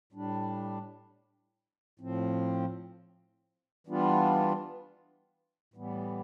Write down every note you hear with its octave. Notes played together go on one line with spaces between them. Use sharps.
A2 G3 D4
A2 F3 C4
E3 G3 B3 D4 F4
A2 E3 G3 B3